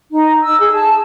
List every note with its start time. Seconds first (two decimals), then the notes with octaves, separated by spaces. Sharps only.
0.11 D#4
0.42 E6
0.60 G#4
0.74 A5